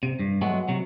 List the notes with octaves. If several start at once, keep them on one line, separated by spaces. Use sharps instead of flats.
C3
G2
F#3 G#3 A3 B3
C3 F#3